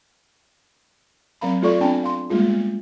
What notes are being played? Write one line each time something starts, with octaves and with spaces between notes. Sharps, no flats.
F#3 C4 A#4 F5 A#5 B5
A3 F4 A4 D5 C#6
B3 C4 D4 G5 A5 B5
F5 C6
G3 G#3 A#3 F4 G#4
B3